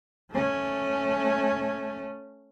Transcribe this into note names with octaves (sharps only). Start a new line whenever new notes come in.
A3 C#4